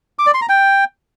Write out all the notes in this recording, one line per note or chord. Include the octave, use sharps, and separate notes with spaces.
D6
D5
C6
A#5
G5